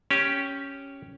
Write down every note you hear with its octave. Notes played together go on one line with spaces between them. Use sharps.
C#4 G4